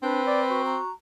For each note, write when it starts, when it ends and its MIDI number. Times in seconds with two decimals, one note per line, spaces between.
0.03 0.77 60
0.03 0.20 62
0.03 0.62 71
0.27 0.41 74
0.50 0.90 66
0.65 0.92 82